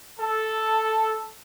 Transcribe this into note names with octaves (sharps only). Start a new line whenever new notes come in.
A4